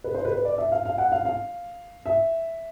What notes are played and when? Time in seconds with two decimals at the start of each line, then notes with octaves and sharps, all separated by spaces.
0.04 B4
0.14 C5
0.25 B4
0.35 B4
0.45 D5
0.58 E5
0.72 F5
0.85 F5
0.98 F#5
1.12 F5
1.25 F5
2.06 E5